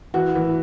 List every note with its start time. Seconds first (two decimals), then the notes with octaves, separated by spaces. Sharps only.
0.14 E3 F#4
0.35 E3